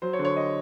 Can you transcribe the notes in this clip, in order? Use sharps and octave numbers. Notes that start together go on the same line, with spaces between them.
F#3 C5
C#5
D3
C#5
D#5